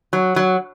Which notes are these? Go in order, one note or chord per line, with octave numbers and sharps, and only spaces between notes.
F#3
F#3